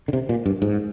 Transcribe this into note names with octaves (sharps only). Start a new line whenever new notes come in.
D3
C3
A#2
G2
G#2